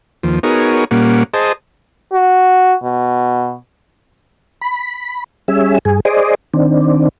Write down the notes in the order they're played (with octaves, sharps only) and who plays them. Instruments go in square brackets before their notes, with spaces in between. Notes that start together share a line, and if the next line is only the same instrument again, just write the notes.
[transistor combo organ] D#2 F3
B3 D#4 F#4 G#4 A#4 C#5
A#2 G3 A#3 C#4 F#5
G#4 C5 D#5 A5
[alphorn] F#4
B2
[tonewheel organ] B5
G3 C#4 G#4 E5
G2 G#4
G#4 C5 D5 D#5
D#3 C4 D4